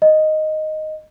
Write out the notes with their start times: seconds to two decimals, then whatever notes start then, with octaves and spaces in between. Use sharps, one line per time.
0.02 D#5